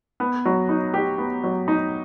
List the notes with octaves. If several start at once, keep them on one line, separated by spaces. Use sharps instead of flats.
B3
F#3
D#4
G4
B3
F#3
D#4